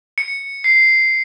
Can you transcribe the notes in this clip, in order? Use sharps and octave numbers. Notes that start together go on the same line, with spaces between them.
C#7
C7